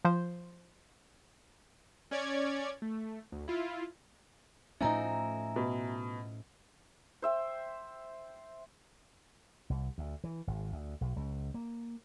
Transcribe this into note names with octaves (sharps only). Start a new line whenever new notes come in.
F3 C5
C#4 C#5 D5 G#6
A3
D2
E4 F4
A2 F3 A3 C#4 D#4 E5 G#5 A#5
B2
C5 E5 G5
C2
D2
E3
G#1
D2
B1
C#2
A#3